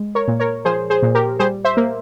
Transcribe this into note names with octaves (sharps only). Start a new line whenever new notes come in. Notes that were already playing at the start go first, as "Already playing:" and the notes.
Already playing: G#3
A#4 C#5
A#2
A#4 C#5
F3 G#4 C5
G#4 C5
A#2
G4 A#4
G3 G#4 C5
C5 E5
A#3